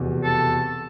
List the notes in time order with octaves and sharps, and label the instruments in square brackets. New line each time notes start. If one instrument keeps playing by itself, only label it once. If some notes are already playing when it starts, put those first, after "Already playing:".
Already playing: [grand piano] F1 E2 B2
[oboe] A4